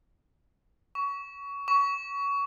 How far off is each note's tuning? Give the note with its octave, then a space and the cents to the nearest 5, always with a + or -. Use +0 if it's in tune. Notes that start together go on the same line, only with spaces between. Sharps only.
C#6 +20
C#6 +20